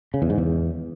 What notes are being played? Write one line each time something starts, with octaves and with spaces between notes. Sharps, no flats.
C#3
E2
G#2
E2